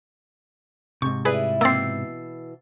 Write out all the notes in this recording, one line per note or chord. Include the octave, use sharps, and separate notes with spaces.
G#2 C3 C#6
A2 G3 E4 G#4 B4
B2 E3 A#3 C4 E6 A6 C7